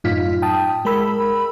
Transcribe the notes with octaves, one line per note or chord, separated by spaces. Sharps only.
F#2 A2 D#4 F4 F6 B6
G5 A5 D#6
G#3 A#4 B5 E6